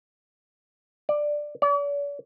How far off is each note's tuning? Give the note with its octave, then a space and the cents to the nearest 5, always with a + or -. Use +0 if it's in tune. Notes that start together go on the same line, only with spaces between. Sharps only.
D5 +10
D5 -45